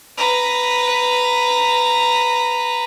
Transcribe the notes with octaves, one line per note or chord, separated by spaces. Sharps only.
B4 A#5